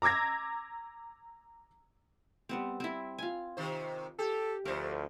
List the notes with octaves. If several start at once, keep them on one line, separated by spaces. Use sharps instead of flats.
A#5 D6 E6 G#6 A#6
G3 B3 C4
C4 E4
F4 G#5
C3 D#3 C5
G4 A4
D2 F3 A3 A#4 C5